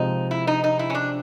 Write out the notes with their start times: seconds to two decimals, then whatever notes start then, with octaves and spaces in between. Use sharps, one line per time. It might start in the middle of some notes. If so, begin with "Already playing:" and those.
Already playing: C3 F3 G#3 D#4
0.31 E4
0.47 D#4
0.64 D#4
0.79 E4
0.90 C#4
0.95 D4